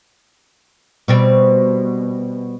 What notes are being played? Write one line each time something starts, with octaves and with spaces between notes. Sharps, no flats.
B2 G3 C4